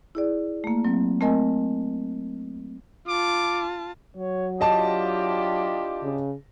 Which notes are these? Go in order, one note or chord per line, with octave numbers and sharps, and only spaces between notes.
E4 G#4 D5
A3 A#3
F#3 C4
A3 C4 A#4 D#5 G#5
F4 A5 D6
F#3 C#5
D4 E4 F4 G4 D#5 A5
C#3